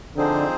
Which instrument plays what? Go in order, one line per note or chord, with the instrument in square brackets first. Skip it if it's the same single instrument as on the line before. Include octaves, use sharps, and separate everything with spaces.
[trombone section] D3 [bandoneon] F3 C4 D#4 G#4 C5